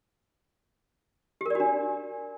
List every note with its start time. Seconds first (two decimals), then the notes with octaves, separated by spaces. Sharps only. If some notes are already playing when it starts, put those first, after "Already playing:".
1.41 G4
1.46 A#4
1.50 D5
1.55 F#4
1.60 D4